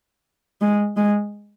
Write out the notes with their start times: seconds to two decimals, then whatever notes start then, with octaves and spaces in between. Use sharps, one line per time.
0.61 G#3
0.97 G#3